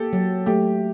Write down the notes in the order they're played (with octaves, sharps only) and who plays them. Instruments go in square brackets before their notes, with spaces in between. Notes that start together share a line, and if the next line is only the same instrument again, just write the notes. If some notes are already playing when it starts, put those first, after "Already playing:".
Already playing: [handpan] A#3 [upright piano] G4 A4
[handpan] F#3
[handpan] A3 [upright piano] G4